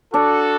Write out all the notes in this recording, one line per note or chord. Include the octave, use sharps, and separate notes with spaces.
D4 F#4 A4